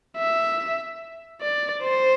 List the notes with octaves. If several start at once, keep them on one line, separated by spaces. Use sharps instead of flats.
E5
D5
C5